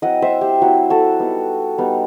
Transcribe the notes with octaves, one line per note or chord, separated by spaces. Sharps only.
F#3 C4 E4 D#5 F#5
C5 E5
G4
F#3 C4 E4 F#4
F#4 A4
G3 B3 D#4
G3 B3 D#4